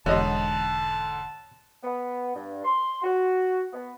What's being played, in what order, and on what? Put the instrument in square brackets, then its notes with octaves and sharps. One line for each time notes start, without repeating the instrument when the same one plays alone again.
[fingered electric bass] E1 [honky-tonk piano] G#2 D3 [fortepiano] C#5 D#5 [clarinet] A5
[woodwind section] B3
G2
C6
F#4
B3